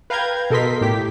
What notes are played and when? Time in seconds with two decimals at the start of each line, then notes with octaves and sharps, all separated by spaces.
0.10 B4 F5 G5 A#5 G6 G#6
0.50 B2 A4 A#4 D#5 C6 B6
0.81 A2 G4 B6